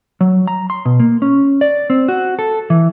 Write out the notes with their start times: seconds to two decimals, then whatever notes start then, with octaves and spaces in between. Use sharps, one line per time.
0.21 F#3
0.47 A#5
0.70 C6
0.85 B2
1.00 A#3
1.22 C#4
1.61 D5
1.90 C4
2.08 F#4
2.39 A4
2.70 E3